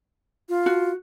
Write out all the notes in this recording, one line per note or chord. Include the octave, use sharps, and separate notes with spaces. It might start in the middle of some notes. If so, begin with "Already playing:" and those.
F4
F#4